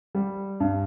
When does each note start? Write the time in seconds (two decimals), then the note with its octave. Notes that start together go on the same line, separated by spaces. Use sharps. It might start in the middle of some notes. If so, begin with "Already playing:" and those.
0.15 G3
0.60 G2